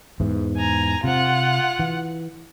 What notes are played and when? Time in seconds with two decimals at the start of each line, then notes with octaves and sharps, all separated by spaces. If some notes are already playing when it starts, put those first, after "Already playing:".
0.20 E2 G#2 E3
0.57 G#5 A#5
1.04 C3 C4 F4 F#5
1.79 E3